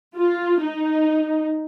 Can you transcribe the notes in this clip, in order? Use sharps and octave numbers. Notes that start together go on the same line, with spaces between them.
F4
D#4